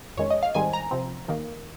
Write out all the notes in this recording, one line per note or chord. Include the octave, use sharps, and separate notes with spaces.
F2 D#3 G#3 C#4 C#5
D#5
F5
G#2 D#3 G3 C4 D#4 G#5
A#5
C3 F3 C4
D#2 D#3 A#3